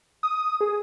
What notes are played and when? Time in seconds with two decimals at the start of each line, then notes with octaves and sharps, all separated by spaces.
0.23 D#6
0.61 G#4